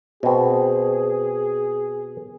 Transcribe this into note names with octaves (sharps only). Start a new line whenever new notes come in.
B2 C4 G#4